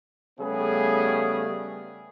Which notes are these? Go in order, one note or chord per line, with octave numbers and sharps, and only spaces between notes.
C#3 G3 A3 B3 G#4